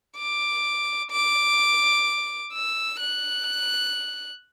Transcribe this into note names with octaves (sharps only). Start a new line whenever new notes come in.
D6
D6
E6
F#6